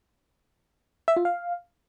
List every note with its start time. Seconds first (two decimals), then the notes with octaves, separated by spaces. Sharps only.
1.08 E5
1.17 F4
1.25 F5